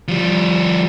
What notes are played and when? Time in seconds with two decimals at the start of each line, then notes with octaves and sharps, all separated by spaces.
0.08 F3 G3